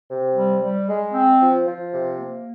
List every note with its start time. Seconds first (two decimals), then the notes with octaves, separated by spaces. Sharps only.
0.09 C3
0.35 G3
0.62 G3
0.88 G#3
1.14 C4
1.41 F3
1.66 F3
1.92 C3
2.18 A#3